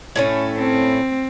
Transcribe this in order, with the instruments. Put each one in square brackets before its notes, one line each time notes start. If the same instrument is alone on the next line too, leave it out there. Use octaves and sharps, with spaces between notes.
[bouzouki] A2 A3 C#4
[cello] C4